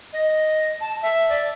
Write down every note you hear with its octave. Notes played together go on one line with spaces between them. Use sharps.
D#5
A5
E5
D5